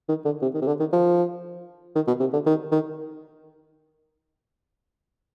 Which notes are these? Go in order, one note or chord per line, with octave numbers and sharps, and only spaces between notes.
D#3
D3
C3
D#3
C3
D3
D#3
F3
D#3
B2
C3
D3
D#3
D#3